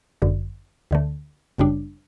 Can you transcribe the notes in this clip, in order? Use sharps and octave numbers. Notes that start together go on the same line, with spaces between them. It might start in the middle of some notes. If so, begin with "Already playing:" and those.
G1 F#2 D3
D2 D3 A3
G1 F#2 C#3 G3 D4